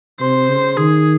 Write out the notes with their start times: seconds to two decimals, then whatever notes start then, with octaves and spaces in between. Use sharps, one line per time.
0.20 C3 C5
0.49 C#3
0.77 D#3 G#4